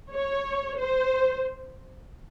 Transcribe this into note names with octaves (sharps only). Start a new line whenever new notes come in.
C#5
C5